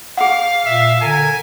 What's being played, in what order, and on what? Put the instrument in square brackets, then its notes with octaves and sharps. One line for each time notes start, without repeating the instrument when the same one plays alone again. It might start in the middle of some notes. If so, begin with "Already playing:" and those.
[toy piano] G#4 F#5 [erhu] F5
[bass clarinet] A#2 [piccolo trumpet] E5
[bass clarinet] D3 [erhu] A#4 [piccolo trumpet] G#5